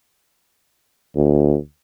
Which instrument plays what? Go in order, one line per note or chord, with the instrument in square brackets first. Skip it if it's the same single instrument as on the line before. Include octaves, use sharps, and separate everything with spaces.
[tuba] D2